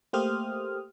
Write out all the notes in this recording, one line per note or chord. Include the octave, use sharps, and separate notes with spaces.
A3 A#3 G4 C5 D#6 F6